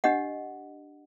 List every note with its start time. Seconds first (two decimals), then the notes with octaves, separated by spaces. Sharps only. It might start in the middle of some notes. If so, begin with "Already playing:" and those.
0.04 D4 G4 D#5 F#5